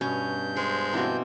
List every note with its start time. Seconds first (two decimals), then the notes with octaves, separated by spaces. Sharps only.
0.01 G2 B2 C#4 G6
0.57 G#3 C5
0.93 B2 D3 E3 A#3 C4